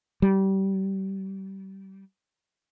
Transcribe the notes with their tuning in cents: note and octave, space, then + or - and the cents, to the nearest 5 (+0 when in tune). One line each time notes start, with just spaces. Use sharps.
G3 -25